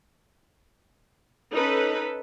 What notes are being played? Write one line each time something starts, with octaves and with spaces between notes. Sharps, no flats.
C#4 D#4 A4 B4